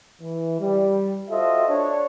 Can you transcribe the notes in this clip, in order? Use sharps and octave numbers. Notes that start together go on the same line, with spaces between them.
E3
G3
F4 F#4 A4 C5 D#5 E5
D4 C#5